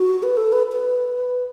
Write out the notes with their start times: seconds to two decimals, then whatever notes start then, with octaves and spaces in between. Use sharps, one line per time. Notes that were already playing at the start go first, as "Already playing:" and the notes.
Already playing: F#4
0.23 B4
0.37 A4
0.52 B4
0.72 B4